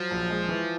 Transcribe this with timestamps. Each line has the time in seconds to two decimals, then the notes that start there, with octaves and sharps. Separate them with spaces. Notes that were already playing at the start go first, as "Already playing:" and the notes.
Already playing: F3 F#3
0.11 A#1
0.30 G#3
0.49 E3